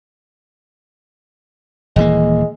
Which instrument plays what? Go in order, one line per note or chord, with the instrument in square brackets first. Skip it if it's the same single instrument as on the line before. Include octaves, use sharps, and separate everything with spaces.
[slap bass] D#1 E3 A#3 [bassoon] G#3